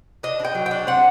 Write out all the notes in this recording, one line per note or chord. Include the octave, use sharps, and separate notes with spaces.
D4 D#5
D4
G5
F#3
G5
D4
C4 F#5